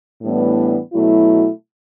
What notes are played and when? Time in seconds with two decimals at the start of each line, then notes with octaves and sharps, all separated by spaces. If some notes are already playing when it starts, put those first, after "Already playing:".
0.22 A2 E3 G3 B3 D4
0.93 B2 F#3 A3 E4